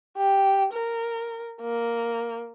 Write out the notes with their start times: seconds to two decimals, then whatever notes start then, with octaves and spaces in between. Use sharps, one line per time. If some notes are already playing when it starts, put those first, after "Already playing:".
0.17 G4
0.73 A#4
1.61 A#3